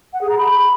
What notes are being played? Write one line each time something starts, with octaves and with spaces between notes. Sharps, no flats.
F#5
G#4
A#5
B5